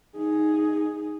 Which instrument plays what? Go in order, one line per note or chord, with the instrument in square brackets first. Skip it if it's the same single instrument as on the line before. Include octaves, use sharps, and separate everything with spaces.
[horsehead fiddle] D#4 G#4